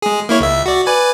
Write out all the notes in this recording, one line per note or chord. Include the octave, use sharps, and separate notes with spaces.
G#3 G#4
A#3 E4 C#5
C#2 E5
F#4 D5
B4 D5 G#5